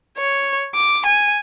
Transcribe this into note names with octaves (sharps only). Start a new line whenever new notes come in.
C#5
D6
G#5